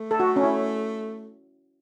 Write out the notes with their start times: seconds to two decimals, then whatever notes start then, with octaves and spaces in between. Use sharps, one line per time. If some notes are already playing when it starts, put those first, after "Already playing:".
Already playing: A3
0.11 A4
0.20 F#4
0.36 C#4
0.43 E4